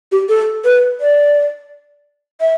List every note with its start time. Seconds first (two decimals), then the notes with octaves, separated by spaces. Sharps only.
0.12 G4
0.29 A4
0.65 B4
1.00 D5
2.41 E5